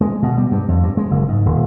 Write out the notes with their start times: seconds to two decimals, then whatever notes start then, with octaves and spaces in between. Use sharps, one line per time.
0.01 G#3
0.23 B2
0.37 G3
0.51 G2
0.68 F2
0.83 G2
0.97 G#3
1.11 F#1
1.28 G#2
1.46 D#1